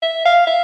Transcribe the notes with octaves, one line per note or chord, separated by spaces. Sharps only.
E5
F5
E5